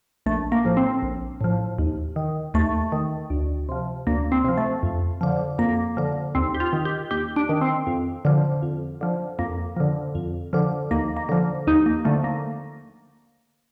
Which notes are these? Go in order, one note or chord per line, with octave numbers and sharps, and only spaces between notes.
A#1 A3
A#3
A2 F3
C4
A#1
A2 F3
D#2
D#3
D#2 A3
D#3
D2
C3 F3
D2 A#3
C4
C3 F3
A3
F2
D3 F3
F2 A#3
D3 F3
D#2 C4
G4
F4
D#3
G4
D#2 G4
D4
D#3
C4
F2
D3 F3
F2
D3 F3
F2 A#3
D3 F3
F2
D3 F3
D#2 A#3
A#3
D3 F3
D#2 D#4
A#3
D3 F3 A3
A#3